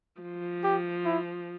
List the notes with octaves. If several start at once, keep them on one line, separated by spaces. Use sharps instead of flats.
F3
G4
E4